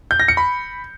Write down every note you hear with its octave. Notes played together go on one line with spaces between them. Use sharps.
G6
A#6
C#7
B5